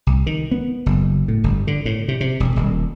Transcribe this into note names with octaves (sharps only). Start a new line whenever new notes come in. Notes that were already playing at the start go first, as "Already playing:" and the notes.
C2
D#3
B3
F#1
A2
G1
D3
A2
C3
C3
E1
D#1